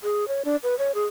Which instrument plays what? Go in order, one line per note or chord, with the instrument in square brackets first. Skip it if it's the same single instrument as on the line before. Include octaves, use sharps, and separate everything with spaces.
[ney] G#4
C#5
D4
B4
C#5
G#4